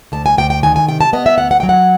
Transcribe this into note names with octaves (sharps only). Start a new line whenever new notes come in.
D2 A5
G#5
D2 G5
G5
D#3 G#5
G#5
C3 G5
A5
B3 D#5
E5
D2 F#5
F#5
F#3 G5
F#5